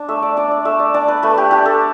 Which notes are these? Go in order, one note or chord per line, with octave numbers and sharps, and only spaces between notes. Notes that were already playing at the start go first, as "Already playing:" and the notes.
Already playing: D4
A3 E5
D5
D4 D5
D5
A3 E5
D5
D4 D5
B4
A3 B4
G4
D4 G4
A4